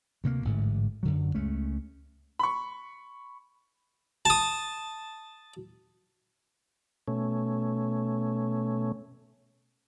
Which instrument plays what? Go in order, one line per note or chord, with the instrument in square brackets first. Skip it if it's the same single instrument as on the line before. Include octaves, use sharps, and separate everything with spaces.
[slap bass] D2 C3 G3 A#3
A1 G#2 D3
F#2 D3 F#3
C#2 G#3 A3 C#4
[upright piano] B5 C#6
[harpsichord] A5 D#6
[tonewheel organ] B2 A3 C#4